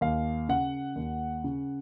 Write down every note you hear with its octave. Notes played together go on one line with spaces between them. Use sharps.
D#2 F5
C#3 F#5
D#2
C#3